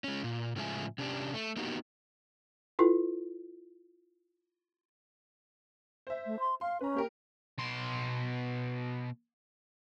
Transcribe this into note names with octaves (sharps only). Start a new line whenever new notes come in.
G#3 C#4
A#2
A2 C#3 F3 G#3 E5 G#5
C3 C#4 D4 G4
A3
A#3 B3 D#4 F#4 G4
E4 F4 A4 B4
C5 E5
A3
C6
F5 C6
C#4 B4 A#5
A#3 G4 A#4
B2 C6